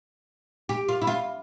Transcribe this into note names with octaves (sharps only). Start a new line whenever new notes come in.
G4
F4
E4
F4